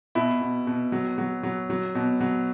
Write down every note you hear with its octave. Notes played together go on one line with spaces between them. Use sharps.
B2 E4
B2
B2
F#3
F#3
F#3
F#3
B2
F#3